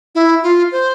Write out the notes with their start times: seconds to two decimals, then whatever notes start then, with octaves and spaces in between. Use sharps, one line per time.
0.15 E4
0.43 F4
0.72 C5